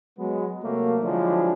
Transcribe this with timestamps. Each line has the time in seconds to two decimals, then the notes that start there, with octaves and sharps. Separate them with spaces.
0.19 F#3 G#3 B3
0.63 C3 F#3 A3 A#3
1.04 D3 F3 F#3 G#3 D4 E4